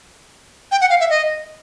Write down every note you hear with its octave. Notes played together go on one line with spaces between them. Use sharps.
G5
F#5
F5
E5
D#5